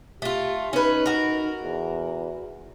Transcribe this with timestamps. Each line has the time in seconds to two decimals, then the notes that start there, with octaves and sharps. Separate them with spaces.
0.22 A3 F4 G4
0.73 C#4 D#4 B4
1.06 F#4 A#4
1.63 E2